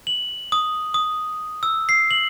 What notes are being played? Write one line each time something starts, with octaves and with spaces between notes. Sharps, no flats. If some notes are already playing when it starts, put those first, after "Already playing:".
F#7
D#6
D#6
E6
C7
F#7